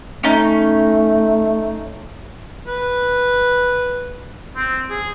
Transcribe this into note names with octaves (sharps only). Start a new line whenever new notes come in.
A3 C#4 D#4
B4
C4
G#4